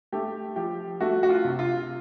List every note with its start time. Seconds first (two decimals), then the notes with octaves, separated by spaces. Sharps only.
0.12 A3 G4
0.56 F3 G4
1.00 A3 F#4
1.23 F#4
1.30 F4
1.45 C3
1.59 F4